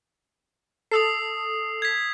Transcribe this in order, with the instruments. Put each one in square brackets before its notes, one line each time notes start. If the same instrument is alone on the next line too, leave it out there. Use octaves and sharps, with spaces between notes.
[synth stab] A4 [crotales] D#6 E6 C7
[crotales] G#6 B6